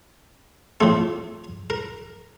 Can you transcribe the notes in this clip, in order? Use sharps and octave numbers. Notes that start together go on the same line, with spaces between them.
A2 F3 A3 C4
A#4